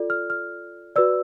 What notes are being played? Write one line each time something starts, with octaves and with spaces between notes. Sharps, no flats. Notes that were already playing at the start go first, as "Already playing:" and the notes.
Already playing: F4 A4 D5
F6
F6
F#4 B4 D5 E6